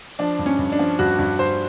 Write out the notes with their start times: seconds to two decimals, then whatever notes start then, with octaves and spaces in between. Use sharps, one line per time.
0.19 F3 D4
0.39 G2
0.46 C#4
0.59 G2
0.72 D4
0.79 F3
0.99 G2 F#4
1.19 G2
1.39 G2 C5